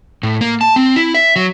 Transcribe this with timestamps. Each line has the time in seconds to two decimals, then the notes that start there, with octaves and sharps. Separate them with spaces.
0.23 A2
0.41 A#3
0.61 A5
0.76 C4
0.96 E4
1.15 E5
1.36 F#3